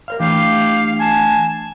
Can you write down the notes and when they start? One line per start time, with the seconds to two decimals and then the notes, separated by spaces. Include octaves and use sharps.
0.08 A#4 C5 F5
0.20 E3 A3 D4 G4 F5
1.00 G#5 A5